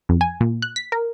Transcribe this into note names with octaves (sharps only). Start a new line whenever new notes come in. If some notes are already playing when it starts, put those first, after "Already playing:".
F2
G#5
A#2
F#6
B6
A#4